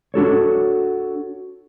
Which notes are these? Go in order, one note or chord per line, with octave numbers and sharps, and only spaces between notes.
D4 F#4 A4 C#5